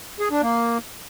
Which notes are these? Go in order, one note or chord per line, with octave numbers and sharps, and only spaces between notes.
G#4
D4
A#3